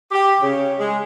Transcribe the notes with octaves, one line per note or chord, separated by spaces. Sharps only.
G4
C#3
G#3